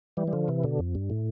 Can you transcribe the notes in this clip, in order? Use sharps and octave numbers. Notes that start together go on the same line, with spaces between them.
E3 G3
G3
D3 F3
C3 E3
B2 D3
F2
G2
A2